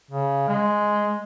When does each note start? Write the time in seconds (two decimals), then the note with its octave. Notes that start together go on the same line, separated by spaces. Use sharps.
0.11 C#3
0.48 G#3